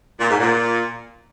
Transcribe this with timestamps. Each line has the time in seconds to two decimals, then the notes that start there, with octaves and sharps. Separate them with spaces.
0.20 A#2
0.30 G#2
0.40 A#2